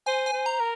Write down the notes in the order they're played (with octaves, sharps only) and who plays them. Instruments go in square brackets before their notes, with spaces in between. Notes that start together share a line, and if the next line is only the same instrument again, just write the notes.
[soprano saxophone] C5 [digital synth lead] G#5
[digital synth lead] G#5
[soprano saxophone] C5
[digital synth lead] A#5
[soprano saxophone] A#4